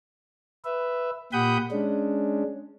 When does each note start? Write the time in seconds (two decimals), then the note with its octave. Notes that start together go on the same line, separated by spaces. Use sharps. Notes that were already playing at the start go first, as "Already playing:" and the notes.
0.65 B4 E5
1.33 A#2 G4 F#5 B5 D#6 G6
1.71 G#3 C#4 D4